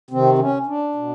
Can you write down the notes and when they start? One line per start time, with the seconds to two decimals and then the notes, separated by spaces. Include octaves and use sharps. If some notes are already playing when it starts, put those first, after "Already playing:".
0.11 C3 D#3 C4
0.39 C#4
0.67 D4
0.95 B2